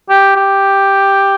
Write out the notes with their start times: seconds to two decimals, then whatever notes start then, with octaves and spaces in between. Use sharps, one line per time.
0.10 G4
0.36 G4